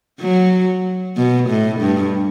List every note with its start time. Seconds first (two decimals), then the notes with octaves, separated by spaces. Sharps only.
0.20 F#3
1.17 B2
1.49 A2
1.80 G2